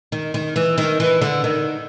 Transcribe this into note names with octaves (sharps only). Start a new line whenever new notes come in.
D#3
D#3
E3
D#3
E3
D3
D#3